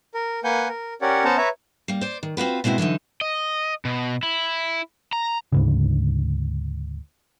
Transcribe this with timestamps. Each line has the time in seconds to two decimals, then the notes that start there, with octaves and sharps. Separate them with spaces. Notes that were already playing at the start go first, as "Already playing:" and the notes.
0.15 A#4
0.44 A#3 B4 F#5 G#5 G6
0.68 A#4
1.02 C#4 G4 A#4 C#5 D5 F#5
1.25 B3 C#4 C5 F#5 A5 A#5
1.37 B4 C#5 E5 A#5
1.88 G3 A#3
2.01 C5 D5
2.23 D#3
2.37 C4 F4 F#4 B4
2.64 B2 G#3 C4 E4 F#4
2.78 D3 E3 F#3 D#4
3.21 D#5
3.85 B2
4.23 E4
5.13 A#5
5.52 D2 G#2 C#3